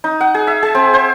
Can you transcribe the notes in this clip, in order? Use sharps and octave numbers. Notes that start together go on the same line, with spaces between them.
D#4
F#5
G#4
E5
G#4
C4
C5